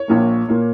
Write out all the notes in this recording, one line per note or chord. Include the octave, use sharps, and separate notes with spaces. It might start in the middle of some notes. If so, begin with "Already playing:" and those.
Already playing: C#5
A#1 A#2 A#3
A#2 A#3